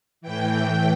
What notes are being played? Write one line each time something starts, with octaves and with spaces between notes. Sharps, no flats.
A2 E3 G5